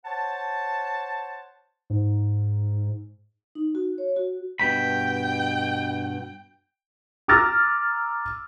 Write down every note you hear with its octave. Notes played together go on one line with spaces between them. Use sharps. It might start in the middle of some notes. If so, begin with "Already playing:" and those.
C5 C#5 F#5 A5
G#2
D#4
F#4
C#5
F#4
G2 B2 G5 B5
A#5 D6 E6 F6 A6 A#6